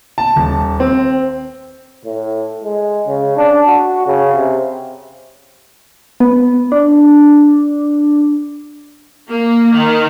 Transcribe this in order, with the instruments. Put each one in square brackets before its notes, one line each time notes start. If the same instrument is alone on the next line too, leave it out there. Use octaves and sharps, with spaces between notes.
[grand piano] A5
D#1
C4
[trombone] A2
G#3
C#3
D4
F#4
C#3
C3
[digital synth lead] B3
D4
[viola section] A#3
D#3